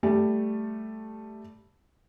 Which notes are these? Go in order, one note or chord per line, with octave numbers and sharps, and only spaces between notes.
G3 A3